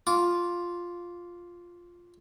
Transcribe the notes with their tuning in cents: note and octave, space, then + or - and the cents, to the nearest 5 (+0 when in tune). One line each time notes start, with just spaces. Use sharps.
F4 +0 D6 -30